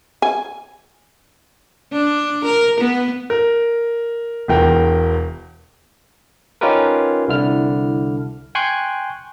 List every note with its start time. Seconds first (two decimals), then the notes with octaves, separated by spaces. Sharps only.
0.22 G#5
1.93 D4
2.45 A#4
2.81 B3
3.30 A#4
4.48 E1 E2 A#4 G5
6.61 C#4 D#4 F4 G4 A#4 B4
7.28 C2 D3 E4 F6
8.55 G5 G#5 C6 C#6 F#6 G6